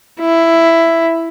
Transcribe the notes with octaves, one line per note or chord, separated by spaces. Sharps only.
E4